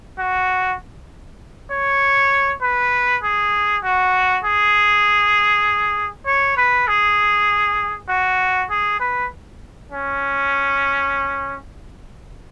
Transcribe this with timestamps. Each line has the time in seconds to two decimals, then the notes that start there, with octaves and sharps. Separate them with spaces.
0.19 F#4
1.71 C#5
2.62 B4
3.23 G#4
3.84 F#4
4.44 G#4
6.27 C#5
6.57 B4
6.88 G#4
8.09 F#4
8.70 G#4
9.00 B4
9.92 C#4